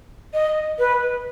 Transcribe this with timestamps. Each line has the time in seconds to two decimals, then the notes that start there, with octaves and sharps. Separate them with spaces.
0.33 D#5
0.79 B4